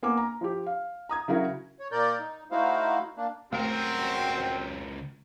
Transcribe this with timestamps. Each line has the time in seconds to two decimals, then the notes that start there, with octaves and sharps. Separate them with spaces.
0.03 A#3 B3 G#5 D6
0.17 A#5
0.41 F3 G4
0.67 F5
1.09 A#5 D#6 G#6
1.28 C#3 F#3 E4 F#4 A#4
1.80 C#5
1.92 A#2 A#4 D5 G6
2.19 D#4
2.51 A3 D#4 E4 F#4 C5 F5
3.17 A#3 D4
3.52 C#2 A3 C4 F#4 A#4